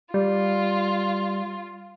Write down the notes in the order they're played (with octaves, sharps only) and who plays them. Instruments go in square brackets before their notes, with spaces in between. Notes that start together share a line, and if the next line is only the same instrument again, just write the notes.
[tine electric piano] G3 [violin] F4